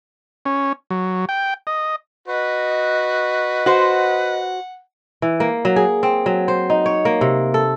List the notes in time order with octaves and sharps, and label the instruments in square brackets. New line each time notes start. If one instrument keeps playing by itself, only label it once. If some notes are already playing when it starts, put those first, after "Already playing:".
[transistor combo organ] C#4
F#3
G5
D#5
[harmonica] F#4 [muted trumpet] B4 [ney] D#5
[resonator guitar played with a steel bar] F#4 C5 [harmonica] F#5
[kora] E3
A#3
F#3
G#4
C4
F#3
C5
D#4
C#5
A#3
C3
A4